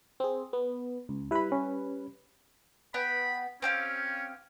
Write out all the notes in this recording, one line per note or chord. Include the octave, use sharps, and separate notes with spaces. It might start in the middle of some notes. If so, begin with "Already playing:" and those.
C4 G#4
B3
C#2
G3 E4 B4 B5
C#4
B3 G5 B5
C4 C#4 G4 F5